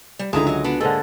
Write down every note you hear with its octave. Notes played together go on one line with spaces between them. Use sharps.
G3
C#2 D3 G#3 A3 D#4 G#4 A5 A#5
F#3 D#5
B3 D4 F#4 B4
G#2 D3 G#3 A#3 A4